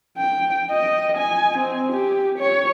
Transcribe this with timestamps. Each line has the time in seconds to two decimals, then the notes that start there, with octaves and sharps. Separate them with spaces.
0.18 G5
0.71 D#5
1.18 G#5
1.58 C4
1.92 G4
2.39 C#5